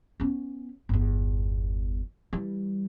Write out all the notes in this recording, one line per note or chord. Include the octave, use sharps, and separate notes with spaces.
B3 C#4
G1 E2
E3 G3